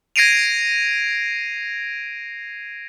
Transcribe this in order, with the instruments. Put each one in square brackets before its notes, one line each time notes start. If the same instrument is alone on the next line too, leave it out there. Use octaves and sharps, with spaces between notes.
[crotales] G#6 A#6 C7 D7 D#7 F7